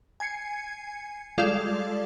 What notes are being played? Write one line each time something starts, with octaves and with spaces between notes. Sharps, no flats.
G#5 G#6 C7 C#7
G3 G#3 F4 A4 D5 F5